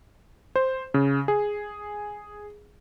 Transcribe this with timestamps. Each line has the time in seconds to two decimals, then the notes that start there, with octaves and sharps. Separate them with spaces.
0.56 C5
0.94 C#3
1.28 G#4